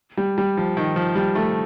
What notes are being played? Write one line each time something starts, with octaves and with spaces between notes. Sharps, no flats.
G3
G3
F3
D#3
F3
G3
A3